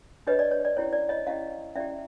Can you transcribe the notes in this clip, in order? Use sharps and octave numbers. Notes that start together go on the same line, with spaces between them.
D4 G4 B4 C#5 D#5
D5
C#5
D5
C#4 E4 G4 C#5
D5
C#5 D#5
C#4 E4 G4 D#5 F5
C#4 E4 G4 D5 E5